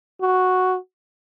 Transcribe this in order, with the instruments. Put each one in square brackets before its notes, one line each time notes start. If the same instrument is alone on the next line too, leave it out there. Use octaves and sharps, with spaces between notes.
[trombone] F#4